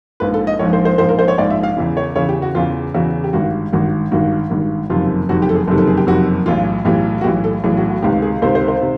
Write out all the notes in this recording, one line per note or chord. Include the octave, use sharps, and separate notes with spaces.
A#1 G#2 F3 B4
A4
D#5
A#1 G#2 F3 C#5
C5
C5
A#1 G#2 F3 C5
A#4
C5
C#5
A#1 G#2 F3 D5
E5
F5
E2 C#3 E3
C#5
E2 C#3 E3 C#5
G4
F#4
E2 C#3 E3 F4
E2 C#3 E3 F#4
G4
G#1 G2 D#3 F#4
G#1 G2 D#3 F#4
G#1 G2 D#3 F#4
G#1 G2 D#3
F#1 F2 C3 D#3 F4
F#1 F2 C3 D#3 F#4
G4
A4
G#4
F#1 F2 C3 D#3 A4
A4
G#4
G4
F#1 F2 C3 D#3 F#4
B1 A2 E3 F4
B1 A2 E3 G4
F#4
B1 A2 E3 G4
A4
B1 A2 E3 G#4
F#4
F#4
C#2 C3 D#3 G4
G#4
C#2 C3 D#3 C5
C5
C5
C3 D#3